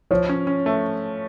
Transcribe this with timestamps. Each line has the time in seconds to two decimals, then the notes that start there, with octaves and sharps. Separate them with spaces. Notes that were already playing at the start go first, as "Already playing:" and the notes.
0.11 F3 C#5
0.29 C#4
0.47 C#4
0.66 A3